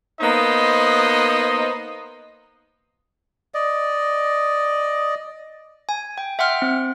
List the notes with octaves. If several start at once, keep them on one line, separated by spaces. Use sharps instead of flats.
A#3 B3 D#4 C5 D#5
D5 D#5
G#5
G5
E5 F#5 G5 C6 F6
C4